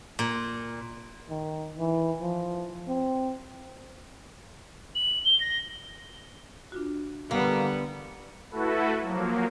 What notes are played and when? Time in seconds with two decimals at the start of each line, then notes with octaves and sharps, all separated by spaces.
0.19 A#2
1.30 D#3
1.78 E3
2.22 F3
2.88 C4
4.95 F#7
5.24 G7
5.40 A#6
6.72 D4 F4 F#4
7.31 D3 G3 A#3 B3 D5 D#5 B5
8.51 A3 E4 F#4 A4 B4
9.02 F3 F#3 A#3